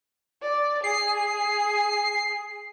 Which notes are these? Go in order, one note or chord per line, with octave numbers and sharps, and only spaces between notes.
D5
G#4 C7